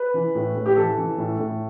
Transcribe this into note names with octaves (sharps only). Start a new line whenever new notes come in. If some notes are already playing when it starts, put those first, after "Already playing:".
Already playing: B4
E3
A2
A2
G4
E3 A4
E3
A2
A2